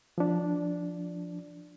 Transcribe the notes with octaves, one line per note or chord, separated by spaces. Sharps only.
F3 D4